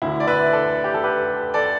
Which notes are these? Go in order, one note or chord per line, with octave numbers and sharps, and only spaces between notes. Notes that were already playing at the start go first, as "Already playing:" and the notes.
D2 D3 E4
D5
B4 E5
A4 D5
G4
A4
G4 B4
A4 D5